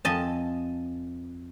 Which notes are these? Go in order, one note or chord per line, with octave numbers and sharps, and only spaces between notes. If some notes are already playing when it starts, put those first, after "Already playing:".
F2 D#5 G#5 A5